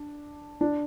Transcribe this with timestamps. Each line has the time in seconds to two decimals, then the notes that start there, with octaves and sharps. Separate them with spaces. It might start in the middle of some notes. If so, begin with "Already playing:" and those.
Already playing: D4
0.61 D4